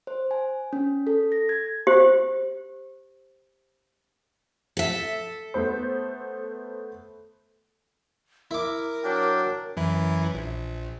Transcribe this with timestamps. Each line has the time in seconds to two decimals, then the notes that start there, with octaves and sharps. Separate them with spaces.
0.07 C5
0.31 G#5
0.73 C#4
1.07 A4
1.32 A#6
1.49 G#6
1.87 G4 C5
4.77 A4 E5
5.54 A3 B3 C5
8.51 E4 A#4 D6
9.04 F#3 D4 G5
9.77 F#2 E3 E4
10.34 A#1